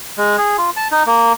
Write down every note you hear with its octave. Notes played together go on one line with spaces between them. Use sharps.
G#3
G#4
F4
A5
D#4
A#3